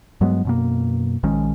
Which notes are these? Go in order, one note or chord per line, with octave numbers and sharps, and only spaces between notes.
G2 F#3 G#3 B3
F#2 B2 A#3
A#1 D#3 G#3 C#4